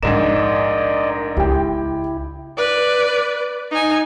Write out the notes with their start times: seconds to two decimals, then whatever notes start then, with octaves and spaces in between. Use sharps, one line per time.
0.03 A#1 G#2 A3 A#4 D5 D#5 E7
1.37 C#2 E4 G4 G5
2.58 B4 D5
3.71 D#4 G#5